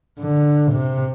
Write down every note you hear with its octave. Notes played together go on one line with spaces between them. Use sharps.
D3
C3